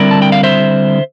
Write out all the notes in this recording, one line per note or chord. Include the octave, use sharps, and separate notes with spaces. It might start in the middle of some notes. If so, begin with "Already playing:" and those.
Already playing: D3 G3 C4 E4 A#4 D5
A5
G5
F5
C5 E5